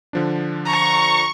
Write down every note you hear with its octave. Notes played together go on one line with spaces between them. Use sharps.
D3 F3 D4
A#5 C#6